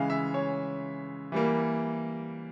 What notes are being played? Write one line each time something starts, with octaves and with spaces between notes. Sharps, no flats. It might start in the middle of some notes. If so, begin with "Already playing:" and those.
Already playing: C#3 E3 G#3 F5
E5
C#5
E3 G3 A#3